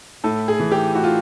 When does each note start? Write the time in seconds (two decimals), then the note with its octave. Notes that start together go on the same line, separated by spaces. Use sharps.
0.24 A2 A4
0.48 G#4
0.59 E3
0.72 G4
0.94 A2 F#4
1.04 F4